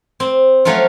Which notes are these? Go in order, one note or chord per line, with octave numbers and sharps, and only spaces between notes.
C4
F3 F#3 A3 C#4 F4